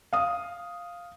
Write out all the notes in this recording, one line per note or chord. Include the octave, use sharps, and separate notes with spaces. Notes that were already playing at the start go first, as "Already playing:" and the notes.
F5 D#6